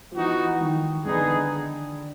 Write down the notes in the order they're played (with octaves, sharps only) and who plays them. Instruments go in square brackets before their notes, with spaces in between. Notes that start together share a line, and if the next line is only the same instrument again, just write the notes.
[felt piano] F3
[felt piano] E3 [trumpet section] B3 D#4 F#4
[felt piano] D#3
[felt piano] D3 [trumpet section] B3 D#4 G#4